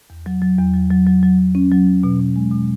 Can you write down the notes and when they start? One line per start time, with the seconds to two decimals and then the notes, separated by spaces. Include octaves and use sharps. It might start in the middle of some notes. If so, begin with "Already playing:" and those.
0.10 E2
0.26 F#3
0.42 F#3
0.58 E2
0.74 F#3
0.90 F#3
1.07 F#3
1.23 F#3
1.39 F#3
1.55 C#4
1.72 F#3
1.87 F#3
2.04 B2
2.20 B2
2.36 G#3
2.52 B2